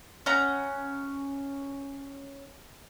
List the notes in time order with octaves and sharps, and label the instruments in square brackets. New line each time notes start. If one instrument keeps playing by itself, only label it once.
[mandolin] C#4 F#5 A#5